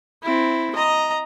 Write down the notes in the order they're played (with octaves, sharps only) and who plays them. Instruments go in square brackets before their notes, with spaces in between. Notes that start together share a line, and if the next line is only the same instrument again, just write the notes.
[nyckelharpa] C4 E4
D#5 A#5